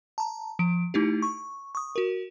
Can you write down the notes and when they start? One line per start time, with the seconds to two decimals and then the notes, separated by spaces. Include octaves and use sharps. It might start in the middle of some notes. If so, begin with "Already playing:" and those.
0.18 A5 A#5
0.59 F3 D7
0.94 A3 D#4 E4 G4
1.22 C#6
1.75 C#6 D#6
1.96 F#4 A#4